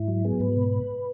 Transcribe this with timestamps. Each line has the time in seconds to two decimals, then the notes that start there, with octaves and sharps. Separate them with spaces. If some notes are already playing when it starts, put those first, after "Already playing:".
Already playing: G#2 E4
0.08 F#3
0.24 B3 G#4
0.40 G#2 B4
0.56 B2